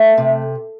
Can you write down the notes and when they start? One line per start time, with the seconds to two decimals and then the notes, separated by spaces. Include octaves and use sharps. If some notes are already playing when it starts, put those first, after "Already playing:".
Already playing: A3
0.17 C3